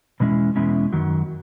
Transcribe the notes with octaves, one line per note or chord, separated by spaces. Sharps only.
E2 B2 G#3 C#4 E4
E2 B2 G#3 C#4 E4
F#2 D#3 F#3